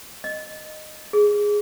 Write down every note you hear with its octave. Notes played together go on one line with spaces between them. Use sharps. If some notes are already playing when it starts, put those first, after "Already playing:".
D#5
G#4